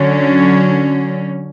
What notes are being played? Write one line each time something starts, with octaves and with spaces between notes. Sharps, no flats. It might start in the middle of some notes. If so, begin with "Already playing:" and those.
Already playing: D3 F#3 C#4